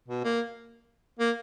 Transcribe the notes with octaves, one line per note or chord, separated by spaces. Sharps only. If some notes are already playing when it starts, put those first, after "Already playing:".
B2
A#3
A#3